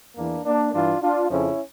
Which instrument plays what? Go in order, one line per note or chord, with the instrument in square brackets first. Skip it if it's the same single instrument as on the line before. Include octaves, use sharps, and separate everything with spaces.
[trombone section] E2 E3 A#3 D4
A#3 D4
G2 E3 D4 F4
D4 F4
F2 C#3 F3 C#4 E4